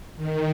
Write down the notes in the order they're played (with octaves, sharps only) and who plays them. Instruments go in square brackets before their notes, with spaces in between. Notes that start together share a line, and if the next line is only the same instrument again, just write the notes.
[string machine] D#3